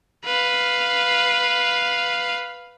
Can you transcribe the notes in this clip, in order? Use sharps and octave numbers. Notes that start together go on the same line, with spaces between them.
B4 F5